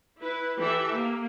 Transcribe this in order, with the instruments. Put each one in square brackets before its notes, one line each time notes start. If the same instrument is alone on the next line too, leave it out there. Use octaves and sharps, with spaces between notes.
[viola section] E4 B4
E3 G4 A4 E5
A#3